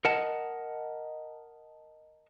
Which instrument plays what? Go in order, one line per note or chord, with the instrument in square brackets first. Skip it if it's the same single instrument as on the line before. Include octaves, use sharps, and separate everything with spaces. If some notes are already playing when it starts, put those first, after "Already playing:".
[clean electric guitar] A#4 D#5 F#5 A5